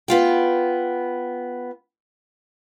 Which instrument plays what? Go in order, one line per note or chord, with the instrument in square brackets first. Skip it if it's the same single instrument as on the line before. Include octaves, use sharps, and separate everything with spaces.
[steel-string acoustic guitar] B3 F4 G5